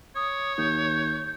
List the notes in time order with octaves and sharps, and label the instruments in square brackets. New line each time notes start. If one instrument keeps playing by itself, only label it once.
[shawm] C#5 [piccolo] D#6
[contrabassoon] D#2 [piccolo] G6